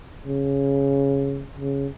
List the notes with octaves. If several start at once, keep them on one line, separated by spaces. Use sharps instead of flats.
C#3
C#3